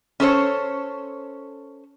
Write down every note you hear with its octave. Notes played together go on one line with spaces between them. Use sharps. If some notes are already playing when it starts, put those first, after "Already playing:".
C#4 A4 C5 C#5